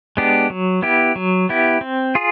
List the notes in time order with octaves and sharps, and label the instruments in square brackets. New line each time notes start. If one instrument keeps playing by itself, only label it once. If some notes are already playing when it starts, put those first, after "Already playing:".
[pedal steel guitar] G#3 B3 D4 G4
F#3
B3 E4 G4
F#3
B3 E4 G4
C4
F4 G#4